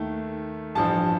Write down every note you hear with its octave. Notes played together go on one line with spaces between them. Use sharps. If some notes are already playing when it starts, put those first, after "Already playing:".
Already playing: D#2 D#3 A3
A1 G2 F3 A5